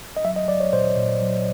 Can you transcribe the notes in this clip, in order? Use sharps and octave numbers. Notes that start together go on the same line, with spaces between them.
D#5
F#3 E5
D#5
F#3 D5
C#5
A#2 C5
A#2
F#3